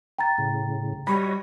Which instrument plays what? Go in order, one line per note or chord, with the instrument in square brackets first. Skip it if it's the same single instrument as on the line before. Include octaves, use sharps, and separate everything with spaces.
[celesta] G5 A#5 A6
[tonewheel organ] A2 C#3
[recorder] G3 [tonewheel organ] F#4 C#5 D#5 [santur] B5